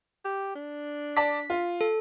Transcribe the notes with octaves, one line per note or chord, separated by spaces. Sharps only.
G4
D4
D5 A5 D6 B6
F4
A4